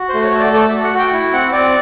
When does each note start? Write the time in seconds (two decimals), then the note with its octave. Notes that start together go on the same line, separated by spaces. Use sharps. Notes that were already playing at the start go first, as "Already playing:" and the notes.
Already playing: F#4
0.09 C5
0.14 A3
0.24 C#5
0.34 A4 D5
0.53 A3 D5
0.69 F#4 E5
0.84 F#5
0.93 F#4 G5
1.13 E4
1.33 C4 F#5
1.52 C4 D5